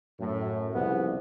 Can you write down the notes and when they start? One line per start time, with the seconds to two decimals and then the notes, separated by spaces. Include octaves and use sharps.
0.20 F#2 A2
0.75 C2 F2 C#3 F3 B3